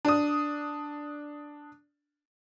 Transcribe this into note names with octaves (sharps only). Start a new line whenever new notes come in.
D4 D#6